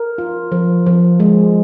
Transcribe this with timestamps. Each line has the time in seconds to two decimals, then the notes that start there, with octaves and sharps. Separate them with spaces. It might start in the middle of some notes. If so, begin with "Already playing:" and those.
Already playing: A#4
0.18 F4
0.52 F3
0.86 F3
1.20 G#3